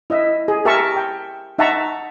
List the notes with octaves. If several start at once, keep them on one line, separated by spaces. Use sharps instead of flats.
E4 D#5 E5
G#4
G4 A#4 E5 A5 A#5 C#6
G5
D#4 E5 F#5 A5 A#5 C#6